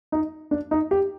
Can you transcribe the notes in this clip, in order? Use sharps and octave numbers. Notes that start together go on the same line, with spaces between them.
D#4
D4
D#4
G4